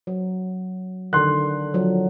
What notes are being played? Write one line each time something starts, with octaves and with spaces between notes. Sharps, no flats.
F#3
D3 D#3 C6 F#6
F3 F#3